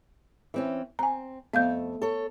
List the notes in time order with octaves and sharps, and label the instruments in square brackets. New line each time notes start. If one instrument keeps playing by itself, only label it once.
[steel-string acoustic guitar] E3 C4 C#4
[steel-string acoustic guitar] C4 [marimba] G#5 A#5
[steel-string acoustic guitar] F2 A3 [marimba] B3 F5 G6
[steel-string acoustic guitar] A4 C#5